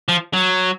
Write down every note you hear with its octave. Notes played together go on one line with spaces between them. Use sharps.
F3
F#3